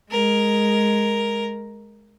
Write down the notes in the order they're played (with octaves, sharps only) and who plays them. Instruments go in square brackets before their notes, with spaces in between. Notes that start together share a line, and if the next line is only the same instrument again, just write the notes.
[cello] G#3 [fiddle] A#4